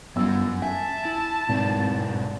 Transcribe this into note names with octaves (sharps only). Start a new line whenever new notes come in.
G1 F#3 C#4 E6
E5 G#5 A5
E4
G#1 B2 C4 E4